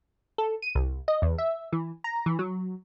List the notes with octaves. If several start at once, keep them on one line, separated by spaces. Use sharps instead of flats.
A4
D#7
C2
D#5
E2
E5
E3
A#5
E3
F#3